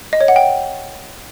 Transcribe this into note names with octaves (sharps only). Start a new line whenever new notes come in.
D#5
C#5
F#5
G5